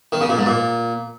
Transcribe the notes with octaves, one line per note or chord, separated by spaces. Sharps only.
D#3
C#3
A#2
G#2
A#2